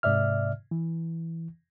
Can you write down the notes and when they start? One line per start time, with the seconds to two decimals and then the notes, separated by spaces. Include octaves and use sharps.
0.03 G#2 C3 D5 E5 F6
0.71 E3